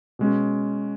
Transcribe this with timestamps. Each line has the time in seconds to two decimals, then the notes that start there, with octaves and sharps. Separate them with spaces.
0.19 B2 G#3 C#4